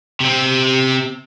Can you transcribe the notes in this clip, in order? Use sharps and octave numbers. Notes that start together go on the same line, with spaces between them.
C3 C4